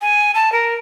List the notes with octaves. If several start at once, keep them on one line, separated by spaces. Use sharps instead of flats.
G#5
A5
A#4